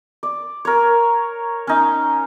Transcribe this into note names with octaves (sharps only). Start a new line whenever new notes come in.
D5
A#4 C#5
C#4 D#4